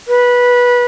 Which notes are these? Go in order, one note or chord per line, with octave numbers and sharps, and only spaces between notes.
B4